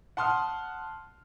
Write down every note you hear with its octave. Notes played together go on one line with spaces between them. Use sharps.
F#5 A5 C6 D#6 F6